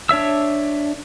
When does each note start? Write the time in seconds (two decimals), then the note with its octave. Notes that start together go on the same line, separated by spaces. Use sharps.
0.09 D4 C#5 E5 E6